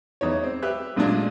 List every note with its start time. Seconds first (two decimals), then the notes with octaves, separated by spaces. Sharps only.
0.21 E2 D#4 C#5
0.43 C4
0.63 G4 B4 E5 F#6
0.96 A1 A#2 G#3 D4 F4